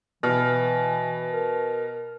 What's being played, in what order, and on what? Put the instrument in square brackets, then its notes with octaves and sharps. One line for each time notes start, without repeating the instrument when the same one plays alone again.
[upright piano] B2 F6 [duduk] E3
[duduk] A#4